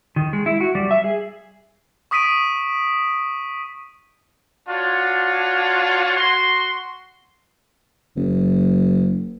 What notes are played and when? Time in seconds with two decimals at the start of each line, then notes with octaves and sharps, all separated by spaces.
0.16 D#3
0.33 G#3
0.46 E4
0.61 F#4
0.75 G3
0.91 E5
1.04 G#4
2.11 C#6 D#6 B6 D7 D#7
4.69 D4 F4 F#4 C#5
6.17 F#4 C6
8.17 F#1